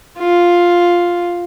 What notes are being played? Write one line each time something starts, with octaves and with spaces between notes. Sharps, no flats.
F4